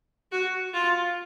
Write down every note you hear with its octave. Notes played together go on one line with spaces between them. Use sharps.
F#4
F4